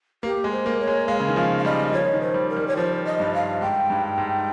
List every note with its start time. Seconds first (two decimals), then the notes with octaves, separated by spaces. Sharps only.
0.23 A#3 G4
0.44 G#3
0.51 C5
0.66 A#3
0.79 C#5
0.87 G#3
1.08 G#3 F5
1.20 C#3
1.29 D#3
1.36 F3 F5
1.58 F5
1.64 G3 D#5
1.93 F3 C#5
2.13 D#3
2.21 C5
2.34 G3
2.49 A#4
2.57 G3
2.68 C#5
2.77 F3 C5
3.05 D#5
3.20 G2
3.34 F5
3.61 G#2 G5
3.90 G2
4.18 G#2